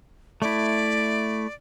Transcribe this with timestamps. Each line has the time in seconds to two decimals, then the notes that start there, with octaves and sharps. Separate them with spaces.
0.42 A3 E4 D5